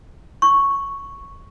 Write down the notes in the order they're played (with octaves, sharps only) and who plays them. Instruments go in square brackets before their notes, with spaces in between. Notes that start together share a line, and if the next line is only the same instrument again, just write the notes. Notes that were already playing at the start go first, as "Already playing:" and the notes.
[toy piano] C#6